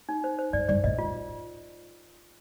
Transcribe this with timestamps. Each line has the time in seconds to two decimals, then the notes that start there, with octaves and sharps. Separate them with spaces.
0.09 D#4
0.24 C5
0.39 C5
0.53 G2 D5
0.69 G2 D5
0.84 A2 D#5
0.99 F4